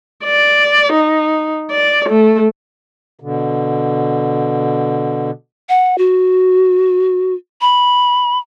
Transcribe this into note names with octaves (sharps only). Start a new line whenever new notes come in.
D5
D#4
D5
A3
B2 D3
F#5
F#4
B5